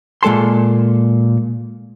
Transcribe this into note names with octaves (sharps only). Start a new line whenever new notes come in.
A#2 G#3 A4 A5 C6